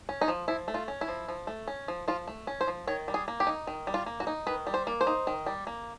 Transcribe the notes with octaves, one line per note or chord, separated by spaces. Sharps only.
C#4
D#4
F3
F3 E4
A3
F4
C#4
E4
F3
F3
A3
C#4
F3
F3 F4
A3
C#4
C5
F3
D#3 C#5
G3
G#4
A#3
G4
D#4
D#3
G3
F4
A#3
F#4
D#4
D#3 B4
G3
C5
A#3
C5
D#4
D#3
G3
A#3